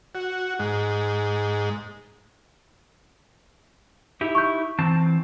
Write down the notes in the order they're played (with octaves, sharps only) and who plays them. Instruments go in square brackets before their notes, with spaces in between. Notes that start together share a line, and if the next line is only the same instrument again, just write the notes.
[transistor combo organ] F#4
G#2
[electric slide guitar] D#4 E4 G4
[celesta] C#6 G6
[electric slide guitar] E3 C4 A5